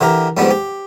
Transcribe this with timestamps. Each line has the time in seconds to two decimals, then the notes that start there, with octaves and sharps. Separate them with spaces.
0.01 D3 E3 G4 A#4
0.37 F2 G#2 F3 G3 B3 D4
0.51 G4